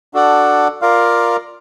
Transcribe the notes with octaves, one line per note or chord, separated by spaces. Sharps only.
D4 F#4 A4 D5 F#5
F4 A#4 D5 F5